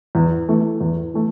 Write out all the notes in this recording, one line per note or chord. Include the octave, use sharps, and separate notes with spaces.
E2
E3 A3
E2
E3 A3